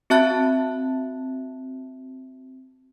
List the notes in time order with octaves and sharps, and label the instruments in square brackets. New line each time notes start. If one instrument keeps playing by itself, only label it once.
[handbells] C4 F#4 E5 A5 F#6